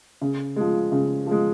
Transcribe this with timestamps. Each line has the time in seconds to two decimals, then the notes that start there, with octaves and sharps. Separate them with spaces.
0.21 C#3
0.56 F3 G#3
0.92 C#3
1.26 F3 G#3